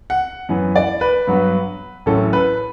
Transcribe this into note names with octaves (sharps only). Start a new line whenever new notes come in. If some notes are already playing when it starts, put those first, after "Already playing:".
F#5
F#2 E3 B3
D5
B4
G2 F#3 B3
A1 A2 F#3 C#4 A4
B4